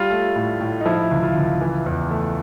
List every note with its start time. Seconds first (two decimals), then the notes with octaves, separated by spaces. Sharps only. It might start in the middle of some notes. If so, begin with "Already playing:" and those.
Already playing: G3 F4
0.10 A3
0.36 A2
0.61 A2
0.81 D#4
0.85 F3 E4
1.11 C#2
1.23 F4
1.36 C#2
1.61 E3
1.86 E2
2.10 A3